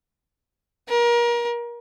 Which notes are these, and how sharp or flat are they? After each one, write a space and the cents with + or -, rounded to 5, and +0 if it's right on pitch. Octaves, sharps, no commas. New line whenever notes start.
A#4 +30